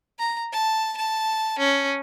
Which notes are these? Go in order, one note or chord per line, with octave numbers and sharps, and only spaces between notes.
A#5
A5
A5
C#4